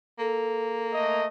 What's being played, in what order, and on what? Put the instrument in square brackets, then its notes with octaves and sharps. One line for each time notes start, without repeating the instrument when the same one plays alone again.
[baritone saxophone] A#3 [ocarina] A4
[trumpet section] A3 D#5